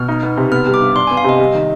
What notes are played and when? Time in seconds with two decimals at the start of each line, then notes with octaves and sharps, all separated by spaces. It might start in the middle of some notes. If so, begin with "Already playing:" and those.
Already playing: B2 F6
0.08 D#4
0.23 B3
0.37 C3
0.52 B3 F6
0.67 G3
0.74 D6
0.81 G2
0.96 D4 C6
1.07 B3 G#5
1.17 F5
1.24 C3 D#5
1.39 G3
1.54 D#3